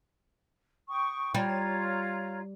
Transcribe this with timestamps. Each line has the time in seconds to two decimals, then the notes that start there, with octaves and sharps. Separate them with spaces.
0.90 G5 C#6 D#6
1.34 G3 F4 C#5 A#5